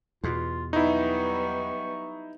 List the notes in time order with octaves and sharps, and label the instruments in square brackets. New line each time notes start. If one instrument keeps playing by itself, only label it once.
[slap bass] E2 B2 [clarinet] F4
[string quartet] F#3 G3 B3 [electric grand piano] D#4 E4 [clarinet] C#6